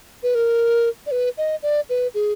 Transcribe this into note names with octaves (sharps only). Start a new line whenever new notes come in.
B4
A#4
D5
B4
D#5
D5
B4
G#4